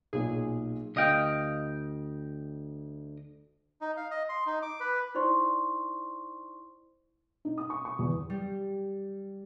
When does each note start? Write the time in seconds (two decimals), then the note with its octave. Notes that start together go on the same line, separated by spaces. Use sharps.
0.13 B1 A#2 G#4
0.96 D2 D#5 F5 G5
3.81 D#4
3.97 F5
4.11 D#5
4.29 C6
4.46 D#4
4.62 D6
4.80 B4
5.15 D#4 E4 C5 D5 C6 C#6
7.45 D#4
7.58 D#6
7.70 C#6
7.85 C#6
7.99 E2
8.30 G3